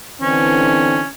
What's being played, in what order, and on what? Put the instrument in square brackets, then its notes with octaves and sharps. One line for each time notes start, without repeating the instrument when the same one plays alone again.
[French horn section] D3 E3 C4 [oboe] C#4